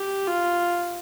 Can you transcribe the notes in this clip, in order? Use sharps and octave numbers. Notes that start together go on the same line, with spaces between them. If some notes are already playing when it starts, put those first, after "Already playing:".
Already playing: G4
F4